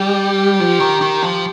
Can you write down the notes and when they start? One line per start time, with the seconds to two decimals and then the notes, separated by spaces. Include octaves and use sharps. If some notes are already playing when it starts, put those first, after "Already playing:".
Already playing: G3 G4
0.60 F3
0.80 D#3
1.01 D#3
1.22 F3